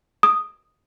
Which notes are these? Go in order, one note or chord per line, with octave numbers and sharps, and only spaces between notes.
D#6